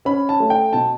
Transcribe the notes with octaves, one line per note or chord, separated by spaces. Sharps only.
C#4 B5
A5
A3
G5
B2 A5